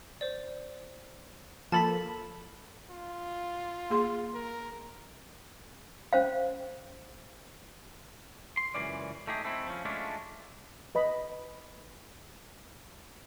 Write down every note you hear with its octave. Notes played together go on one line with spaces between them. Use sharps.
C5 D5
F3 A#3 A4 A5 B5 B6
F4
A#3 G#4 C6
A#4
C#4 C5 F5
C6
C#2 F#2 E3 C#4 D5
A3 D#4 G4 G#4
G#3 A3 C4 E4
F3 C#4
G#3 A3 C#4 D4 E4 F4
B4 D#5 B5